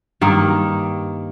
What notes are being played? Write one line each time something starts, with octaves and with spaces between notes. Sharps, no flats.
G2 D#3 A#3